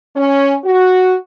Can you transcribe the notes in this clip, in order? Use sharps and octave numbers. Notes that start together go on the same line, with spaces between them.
C#4
F#4